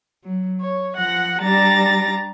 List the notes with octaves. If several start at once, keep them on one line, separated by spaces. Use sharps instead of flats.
F#3
C#5
F3 F#5 A#6
G3 D4 G4 A#5 A6 A#6